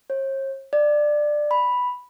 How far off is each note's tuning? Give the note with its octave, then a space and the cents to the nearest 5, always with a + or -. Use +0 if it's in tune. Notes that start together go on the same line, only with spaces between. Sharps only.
C#5 -45
D5 +15
B5 +0